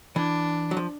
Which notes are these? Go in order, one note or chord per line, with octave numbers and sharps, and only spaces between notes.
E3 D4
F#3
F3